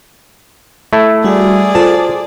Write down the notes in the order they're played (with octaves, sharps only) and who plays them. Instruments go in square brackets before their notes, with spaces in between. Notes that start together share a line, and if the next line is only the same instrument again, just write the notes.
[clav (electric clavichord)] A3 E4
[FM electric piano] G3 F#4 [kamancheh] G#4 D5
[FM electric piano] F4 A4 C5 [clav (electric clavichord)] A5